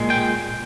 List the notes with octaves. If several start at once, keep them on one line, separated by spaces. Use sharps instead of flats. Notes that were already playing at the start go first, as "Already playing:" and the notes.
Already playing: A#2 G#3
G5